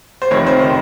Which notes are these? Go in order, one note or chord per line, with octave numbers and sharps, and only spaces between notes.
C5
F1 F2 D#3 C#5
C5
D#3